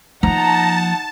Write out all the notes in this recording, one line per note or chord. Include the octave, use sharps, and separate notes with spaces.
F3 A#3 D#4 F#5 A5 A#5